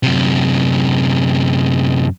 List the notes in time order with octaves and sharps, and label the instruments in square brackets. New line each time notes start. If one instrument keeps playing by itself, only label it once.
[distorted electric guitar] F#2 C3